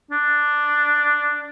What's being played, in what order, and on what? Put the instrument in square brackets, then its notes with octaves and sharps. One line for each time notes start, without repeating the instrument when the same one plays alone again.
[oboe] D4